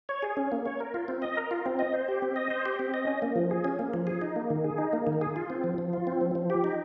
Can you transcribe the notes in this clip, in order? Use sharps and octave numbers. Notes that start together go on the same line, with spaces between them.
C#5
G#4
C#4
A#3
C#5
A#4
F4
C4
D#5
A#4
F4
C4
D#5
C5
G4
C4
D#5
C5
G4
C4
D#5
C#4
A#3
F3
G#4
C#4
A#3
F3
G#4
D#4
A#3
D#3
G#4
D#4
A#3
D#3
G#4
F4
C4
F3
F3
F4
C4
F3
F3
G4
D#4